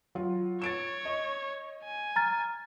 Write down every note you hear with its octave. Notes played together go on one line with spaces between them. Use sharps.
F#3 F4
C#5 A6 D7 E7
D#5
G#5
A#5 F6 A6